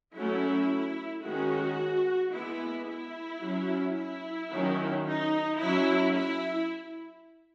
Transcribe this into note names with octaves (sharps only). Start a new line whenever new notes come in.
F#3 A3 C#4 E4
D#3 G#3 C#4 F#4
E3 G#3 B3 E4
E4
F#3 C#4
E4
D#3 F#3 C#4
D#4
F#3 C#4 E4
E4